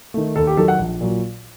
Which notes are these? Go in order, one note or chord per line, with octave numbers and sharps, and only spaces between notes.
D#3 A3
D#2 A4
G4
D#3 F#3 A4
F#5
A#1
A#2 F#3